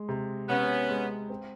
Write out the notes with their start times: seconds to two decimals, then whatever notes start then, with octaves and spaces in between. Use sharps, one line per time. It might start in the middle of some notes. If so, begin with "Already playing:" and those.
Already playing: G#3
0.09 C3
0.49 C3 B3 C#4
0.90 G#3
1.30 C4